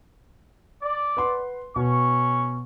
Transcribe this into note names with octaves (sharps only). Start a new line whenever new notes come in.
D5
B4 F#5 C6
B2 C#4 C#6